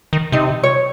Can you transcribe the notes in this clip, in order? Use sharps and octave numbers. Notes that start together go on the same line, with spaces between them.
D#3
C3 D#4
C#5